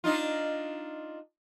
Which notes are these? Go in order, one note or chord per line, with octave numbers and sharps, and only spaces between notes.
D4 D#4 F4